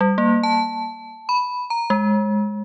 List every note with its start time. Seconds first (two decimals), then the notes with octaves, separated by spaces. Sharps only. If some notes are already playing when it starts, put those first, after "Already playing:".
0.01 G3
0.18 A#3
0.43 A5
1.29 B5
1.70 A#5
1.90 G#3